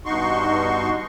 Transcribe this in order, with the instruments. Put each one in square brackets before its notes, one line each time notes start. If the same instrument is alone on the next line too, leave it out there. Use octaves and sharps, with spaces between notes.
[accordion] G2 B2 D#4 F#4 C6 C#6